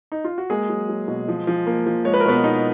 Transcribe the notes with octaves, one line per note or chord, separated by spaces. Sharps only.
D#4
F4
F#4
G#3 A#3 G#4
F#3
F#3
B2
F3
F3
A#3
F3
G#3 C#5
B4
A#4
B2 B3 B4
B2 D#4 D#5